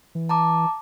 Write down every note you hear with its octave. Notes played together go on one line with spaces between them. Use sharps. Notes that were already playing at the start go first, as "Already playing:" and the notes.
E3
A5 A#5 D6